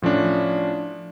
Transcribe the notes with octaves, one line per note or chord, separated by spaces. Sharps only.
A2 F3 C#4 D4